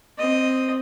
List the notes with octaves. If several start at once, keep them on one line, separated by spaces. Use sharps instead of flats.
C4 D#5